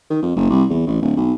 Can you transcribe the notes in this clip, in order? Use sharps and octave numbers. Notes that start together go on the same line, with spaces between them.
D#3
F2
F#1
C2
E2
A1
D1
B1